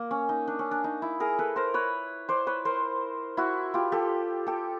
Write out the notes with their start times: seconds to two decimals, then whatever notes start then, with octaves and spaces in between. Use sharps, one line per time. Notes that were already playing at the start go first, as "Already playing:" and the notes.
Already playing: A#3
0.11 C#4
0.29 D#4
0.48 D4
0.59 C#4
0.71 D4
0.84 D#4
1.02 E4
1.20 G#4 A#4
1.39 A4 B4
1.56 A#4 C5
1.74 B4 C#5
2.29 C5 D5
2.47 B4 C#5
2.65 A#4 C5
3.37 E4 F#4
3.74 F4 G4
3.92 G4 A4
4.47 G4 A4